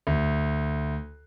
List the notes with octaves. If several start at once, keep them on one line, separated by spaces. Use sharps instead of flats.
D2